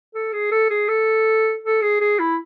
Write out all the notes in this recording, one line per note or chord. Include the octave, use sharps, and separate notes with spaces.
A4
G#4
A4
G#4
A4
A4
G#4
G#4
E4